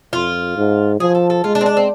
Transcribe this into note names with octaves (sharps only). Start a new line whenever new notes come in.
F2 F4
G#2
F3 G#4
A4
A4
G#3 F4
D4
C4
D4
C4